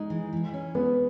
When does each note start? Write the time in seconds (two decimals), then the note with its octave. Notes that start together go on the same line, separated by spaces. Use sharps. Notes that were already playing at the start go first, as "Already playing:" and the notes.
Already playing: G#3 D#4
0.10 E3
0.33 E3
0.54 C#4
0.75 G#3 B3